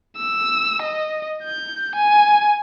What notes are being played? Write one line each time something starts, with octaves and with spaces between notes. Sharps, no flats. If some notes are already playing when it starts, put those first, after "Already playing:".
E6
D#5
G6
G#5